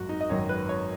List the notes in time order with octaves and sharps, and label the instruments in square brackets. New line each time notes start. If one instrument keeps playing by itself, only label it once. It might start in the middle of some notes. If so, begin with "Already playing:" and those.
Already playing: [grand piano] G#1 F#2 F#4
D#4
D#5
G#1 F#2 D#3 C#5
B4
C#5